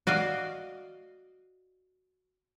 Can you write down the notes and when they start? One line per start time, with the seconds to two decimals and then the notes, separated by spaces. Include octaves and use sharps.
0.07 F#4 D5 D#5 F5